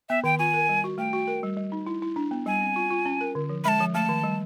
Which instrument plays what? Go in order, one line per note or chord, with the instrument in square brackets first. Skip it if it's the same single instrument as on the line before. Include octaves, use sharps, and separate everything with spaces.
[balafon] B3 [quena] E5
[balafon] D#3 [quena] G5
[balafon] F4 [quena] G#5
[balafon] A#4
G3
F#4
[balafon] A3 [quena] G5
[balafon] F#4
A#4
G3
G3
D#4
E4
E4
D4
B3
[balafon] G3 [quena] G#5
[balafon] C4
F4
F4
C#4
A#4
D3
F3
[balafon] G#3 [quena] A5 B5
[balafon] F3
[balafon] A3 [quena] A5
[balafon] D#3
G3